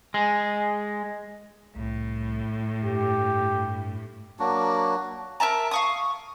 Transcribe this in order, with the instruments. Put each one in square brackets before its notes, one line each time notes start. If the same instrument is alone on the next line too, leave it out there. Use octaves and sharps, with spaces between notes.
[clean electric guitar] G#3
[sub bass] C2 [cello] A2
[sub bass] G2 [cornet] G4
[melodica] F#3 A#3 D4 F#4
[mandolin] A#4 E5 A5 A#5
F5 C#6 D#6